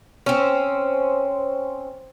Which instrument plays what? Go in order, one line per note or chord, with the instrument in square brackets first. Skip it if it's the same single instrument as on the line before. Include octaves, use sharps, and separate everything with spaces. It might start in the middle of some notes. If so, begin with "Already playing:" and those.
[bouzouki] C4 C#4